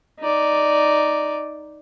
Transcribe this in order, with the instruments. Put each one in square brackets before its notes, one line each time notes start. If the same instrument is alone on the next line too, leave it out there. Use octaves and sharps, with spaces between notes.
[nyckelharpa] D#4 D5